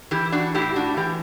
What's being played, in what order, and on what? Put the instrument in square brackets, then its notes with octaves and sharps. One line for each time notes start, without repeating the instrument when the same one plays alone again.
[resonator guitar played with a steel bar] E3 E4 G4
D4 F#4
A2 E4 G4
D4 F#4
E3 G4